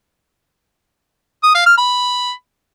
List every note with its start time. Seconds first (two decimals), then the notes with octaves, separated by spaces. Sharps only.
1.43 D#6
1.55 F5
1.66 F6
1.78 B5